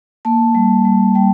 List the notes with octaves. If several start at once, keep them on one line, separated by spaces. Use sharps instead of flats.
A#3 A5
G3
G3
G3 G5